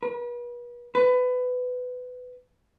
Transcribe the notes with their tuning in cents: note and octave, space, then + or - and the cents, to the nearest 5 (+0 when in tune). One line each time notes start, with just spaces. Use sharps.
B4 -40
B4 +20